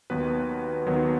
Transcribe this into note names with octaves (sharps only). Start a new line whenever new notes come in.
D#2 D#3 F#3 B3 B4
D#2 D#3 F#3 B3